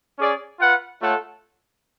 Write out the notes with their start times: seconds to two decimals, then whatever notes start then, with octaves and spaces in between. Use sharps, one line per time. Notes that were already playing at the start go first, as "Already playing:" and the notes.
0.19 C#4 G#4 D5
0.60 F4 B4 F#5
1.01 A3 F4 A4 C#5 F#5